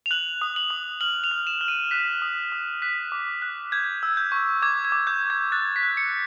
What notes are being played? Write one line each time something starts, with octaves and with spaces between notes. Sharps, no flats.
F7
F#6 F#7
D#6
F#7
D#6
F6 F#7
F7
F6
E7
F6
D#7
F#6 B6
D#6
D#6
F#6 B6
D6
F#6
G6 G#6
E6
G6
C#6
D6 G#6
G#6
D6
G6
G6
G#6
F#6 A6
B6
F#6
C#7